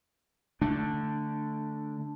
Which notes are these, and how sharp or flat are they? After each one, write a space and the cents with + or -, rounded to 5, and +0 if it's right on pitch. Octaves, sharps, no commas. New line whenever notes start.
D3 +0 A3 +0 D4 +0